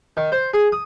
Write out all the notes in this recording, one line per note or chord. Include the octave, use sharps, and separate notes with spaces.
D#3
C5
G#4
D#6